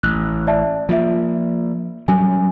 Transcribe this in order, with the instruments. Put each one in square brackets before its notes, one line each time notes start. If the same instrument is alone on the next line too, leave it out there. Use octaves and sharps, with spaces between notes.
[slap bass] A1 [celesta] F#6
[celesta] D5 E5 A5
[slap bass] F3 A#3 [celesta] F4 E5
[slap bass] F#3 G3 C#4 [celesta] G#5